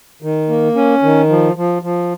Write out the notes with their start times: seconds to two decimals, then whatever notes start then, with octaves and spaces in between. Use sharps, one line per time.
0.22 D#3
0.49 A#3
0.76 C#4
1.03 D#3
1.29 F3
1.56 F3
1.82 F3